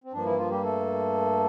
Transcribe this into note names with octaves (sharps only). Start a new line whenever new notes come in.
C4
G2 F3 A#3 D4
E3 E4
F3 F4
G3 G4
A3 A4